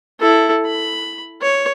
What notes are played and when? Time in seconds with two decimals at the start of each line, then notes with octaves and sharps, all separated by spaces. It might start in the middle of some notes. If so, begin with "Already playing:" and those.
0.20 E4 A4
0.66 B5
1.42 C#5